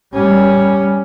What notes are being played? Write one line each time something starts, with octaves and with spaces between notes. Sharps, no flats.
G3 C#4